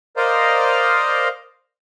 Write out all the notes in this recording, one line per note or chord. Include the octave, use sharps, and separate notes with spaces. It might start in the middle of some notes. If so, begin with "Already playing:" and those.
A#4 C5 D5 D#5 F5 A#5